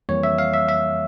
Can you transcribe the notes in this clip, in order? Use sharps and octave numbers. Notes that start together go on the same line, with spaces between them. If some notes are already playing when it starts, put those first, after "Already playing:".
F2 E3 G3 A#3 C#5
E5
F5
E5
E5